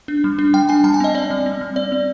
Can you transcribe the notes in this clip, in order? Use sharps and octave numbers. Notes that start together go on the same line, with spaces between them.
D4
G3
D4
G3 G5
D4 G#5
G3 A5
G#5
C4 D#5
C4 D5
G3
C4
G3
C4 D5
C4